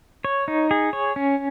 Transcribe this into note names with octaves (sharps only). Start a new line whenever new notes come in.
C#5
D#4
G#4
C#5
C#4